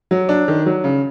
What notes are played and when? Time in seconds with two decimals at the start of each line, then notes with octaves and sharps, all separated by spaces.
0.11 F#3
0.29 D4
0.48 D#3
0.66 F#3
0.84 C#3